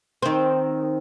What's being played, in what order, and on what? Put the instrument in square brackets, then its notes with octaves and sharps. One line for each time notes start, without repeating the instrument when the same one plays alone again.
[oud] D#3 C4